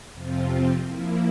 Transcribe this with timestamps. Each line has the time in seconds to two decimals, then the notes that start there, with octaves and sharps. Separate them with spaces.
0.13 F2 C3 F3 C4 F4
0.85 F3 A#3 E4